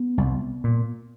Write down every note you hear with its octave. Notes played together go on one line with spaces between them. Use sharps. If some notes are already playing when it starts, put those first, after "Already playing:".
Already playing: B3
C2
A#2